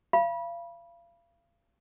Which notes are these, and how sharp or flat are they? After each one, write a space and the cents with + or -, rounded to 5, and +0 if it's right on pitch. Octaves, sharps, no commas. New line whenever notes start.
F5 -35 B5 -25